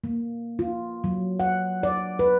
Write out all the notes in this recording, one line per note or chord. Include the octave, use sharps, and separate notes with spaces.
A#3
F4
F#3
F#5
D5
B4